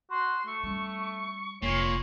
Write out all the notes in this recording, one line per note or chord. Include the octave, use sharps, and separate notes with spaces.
F#4 C6
A3 C#6
G3 C#4
F1 A#2 C#5 C7